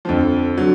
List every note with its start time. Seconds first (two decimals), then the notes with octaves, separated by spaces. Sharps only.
0.05 F2 D3 F3
0.58 D3 F#3